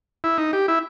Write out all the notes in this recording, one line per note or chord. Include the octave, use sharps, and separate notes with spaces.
E4
D#4
G4
E4